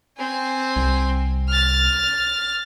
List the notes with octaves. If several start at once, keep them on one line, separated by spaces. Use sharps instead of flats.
C4 G#5
C2
F6 A6